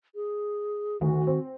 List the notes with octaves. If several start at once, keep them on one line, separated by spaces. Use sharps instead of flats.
G#4
D2 D#3 F#4
C4